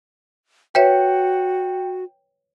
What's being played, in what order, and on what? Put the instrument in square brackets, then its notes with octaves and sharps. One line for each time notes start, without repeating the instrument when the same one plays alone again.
[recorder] F#4 [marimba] B4 C#5 E5 [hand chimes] G5